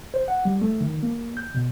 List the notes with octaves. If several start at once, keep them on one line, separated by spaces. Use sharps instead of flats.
C5
F#5
G3
A3
D#3
A#3
G6
B2